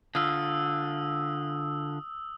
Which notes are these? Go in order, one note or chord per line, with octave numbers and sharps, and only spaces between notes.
D3 F4 D#6 E6